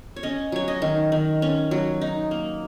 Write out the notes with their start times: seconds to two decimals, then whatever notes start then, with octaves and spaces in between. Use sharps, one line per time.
0.16 C#5
0.23 C#4 D#5
0.52 F#3 C#5
0.68 D#5
0.82 D#3
1.12 D#3
1.42 C#4
1.71 F#3
2.01 D#4
2.31 A#3